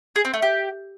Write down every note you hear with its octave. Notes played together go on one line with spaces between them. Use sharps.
G#4
C4
A3
G4